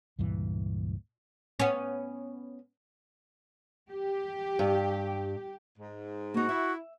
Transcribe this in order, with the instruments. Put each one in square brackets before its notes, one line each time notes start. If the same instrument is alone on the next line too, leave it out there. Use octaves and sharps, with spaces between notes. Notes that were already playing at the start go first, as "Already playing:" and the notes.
[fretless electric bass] C#2 G2 A#2 E3
[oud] B3 C#4
[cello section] G4
[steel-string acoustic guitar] G2
[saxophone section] G#2
[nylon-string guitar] A#3 D#4 [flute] F#4
[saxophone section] E4 [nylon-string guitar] E5